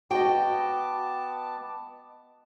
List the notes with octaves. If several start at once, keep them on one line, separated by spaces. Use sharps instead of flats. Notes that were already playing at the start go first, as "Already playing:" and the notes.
B3 F#4 D#5 G5 A5 D6